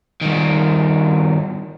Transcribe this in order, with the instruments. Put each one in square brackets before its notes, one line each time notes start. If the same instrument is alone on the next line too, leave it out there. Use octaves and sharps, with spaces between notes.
[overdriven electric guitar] G2 D#3